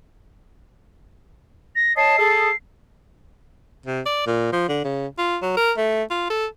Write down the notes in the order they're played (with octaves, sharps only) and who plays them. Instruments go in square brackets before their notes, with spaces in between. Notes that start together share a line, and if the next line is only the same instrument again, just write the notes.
[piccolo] A#6
[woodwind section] C#5 D#5 A5 [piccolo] C7
[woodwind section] G#4 A4
[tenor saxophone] C3
D5
A#2
F3
D3
C#3
F4
F#3
A#4
A3
F4
A4